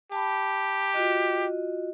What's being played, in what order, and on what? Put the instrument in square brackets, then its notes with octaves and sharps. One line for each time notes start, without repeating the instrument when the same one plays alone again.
[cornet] G4 [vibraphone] A5 B5
[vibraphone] F4 F#4 D#5